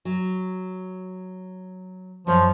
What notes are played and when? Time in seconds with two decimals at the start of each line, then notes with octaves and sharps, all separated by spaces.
0.05 F#3
2.27 F#2 F3 C#5